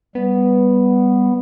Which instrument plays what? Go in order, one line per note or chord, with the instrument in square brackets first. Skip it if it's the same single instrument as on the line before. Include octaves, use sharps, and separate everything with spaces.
[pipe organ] G3 [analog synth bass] B3